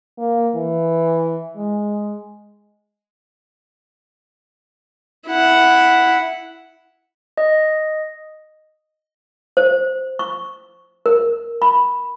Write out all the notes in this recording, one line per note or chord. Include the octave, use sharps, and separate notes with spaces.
A#3
E3
G#3
E4 F#5
D#5
C5
C#6
A#4
B5